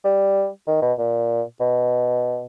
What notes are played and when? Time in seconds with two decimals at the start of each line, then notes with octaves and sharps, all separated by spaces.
0.04 G3
0.67 D#3
0.82 B2
0.98 A#2
1.60 B2